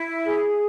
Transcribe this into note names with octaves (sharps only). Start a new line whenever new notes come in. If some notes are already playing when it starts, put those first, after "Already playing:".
Already playing: E4
G#4